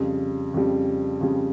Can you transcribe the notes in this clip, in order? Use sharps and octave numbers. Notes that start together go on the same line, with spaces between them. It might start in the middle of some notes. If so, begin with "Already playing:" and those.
Already playing: F2 C#3 G3
F2 C#3 G3
F2 C#3 G3